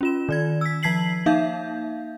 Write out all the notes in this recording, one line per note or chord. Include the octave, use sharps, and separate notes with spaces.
C#4 F4 E7
D#3 D5 G#6
E6 B6
F3 A5 G#6 B6 C7 F#7
A#3 D#4 E5 F5 G6